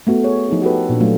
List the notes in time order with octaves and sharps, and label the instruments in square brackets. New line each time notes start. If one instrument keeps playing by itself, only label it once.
[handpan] A3 B3 F#4
G#4 C#5
F3 D#4 E4 G#4
F#4 G4 A4 B4
A#2 D4
F#3 A3 A#3 D4 F4